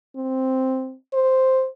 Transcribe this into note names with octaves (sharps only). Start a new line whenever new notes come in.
C4
C5